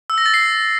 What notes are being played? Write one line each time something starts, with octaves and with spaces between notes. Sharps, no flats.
E6
A#6
A6
C7